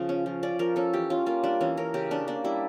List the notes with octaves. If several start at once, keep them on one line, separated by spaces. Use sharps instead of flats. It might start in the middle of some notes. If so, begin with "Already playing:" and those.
Already playing: C#3 F3
C#4
F3
C#4 D5
F3 A#4
C#4 A4
E3 G4
C#4 F4
A#3 F4
G3 D4
E3 C#4
C#4 A#4
C#3 G4
C#4 D4
A#3 D4
G3 E4